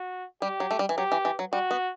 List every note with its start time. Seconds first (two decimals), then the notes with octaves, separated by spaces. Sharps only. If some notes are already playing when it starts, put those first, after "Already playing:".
Already playing: F#4
0.42 G3 G4
0.60 F#3
0.71 A3
0.79 G3
0.89 E3
0.97 F#3 G4
1.12 E3
1.25 E3
1.39 F#3
1.53 G3 F#4
1.71 B3